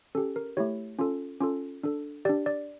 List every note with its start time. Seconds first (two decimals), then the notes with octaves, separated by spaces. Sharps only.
0.15 C#4 G4 A4
0.36 A#4
0.57 A3 E4 G4 C#5
0.99 C#4 F4 A4
1.41 C#4 F4 A4
1.84 D4 A4
2.25 D4 G4 D5
2.46 D5